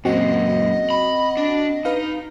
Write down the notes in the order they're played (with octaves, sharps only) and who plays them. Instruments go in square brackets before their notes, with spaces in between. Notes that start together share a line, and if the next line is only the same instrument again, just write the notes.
[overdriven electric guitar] F#2 A#2 [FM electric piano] C4 F#4 F#5 [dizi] D#5
[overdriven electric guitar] B5
D4
[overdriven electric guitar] D#4 [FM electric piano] B4 F5